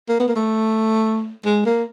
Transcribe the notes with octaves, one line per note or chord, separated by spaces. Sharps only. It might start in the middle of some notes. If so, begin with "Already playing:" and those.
A#3
B3
A#3
A3
G#3
A#3